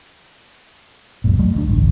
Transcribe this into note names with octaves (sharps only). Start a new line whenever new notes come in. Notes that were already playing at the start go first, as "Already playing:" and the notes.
C#2 F#2 A#2
F#3 G#3 A3
D2 D4
A1 D2 G2